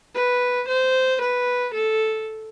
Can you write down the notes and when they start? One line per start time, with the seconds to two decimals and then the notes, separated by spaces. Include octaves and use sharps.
0.15 B4
0.68 C5
1.21 B4
1.74 A4